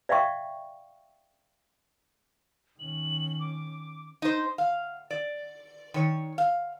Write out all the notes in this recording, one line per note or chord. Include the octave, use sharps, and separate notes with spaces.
D5 E5 F5 G5 C#6
D#3 C#4 F#7
D6
D#4 C5
F5
D5
D#3 C#5
F5